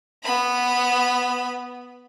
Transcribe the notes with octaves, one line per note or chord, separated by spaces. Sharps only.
B3 B5